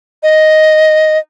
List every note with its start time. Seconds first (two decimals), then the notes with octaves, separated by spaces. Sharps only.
0.23 D#5